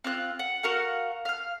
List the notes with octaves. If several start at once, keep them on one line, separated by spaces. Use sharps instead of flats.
C4 F4 F#6
F#5
F#4 A#4 F5 F#5
F5 F6